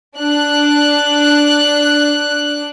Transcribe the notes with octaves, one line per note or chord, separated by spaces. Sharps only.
D4 F#6